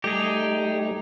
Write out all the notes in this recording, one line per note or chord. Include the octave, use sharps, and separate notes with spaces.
G3 A3 D#4 G4 G#4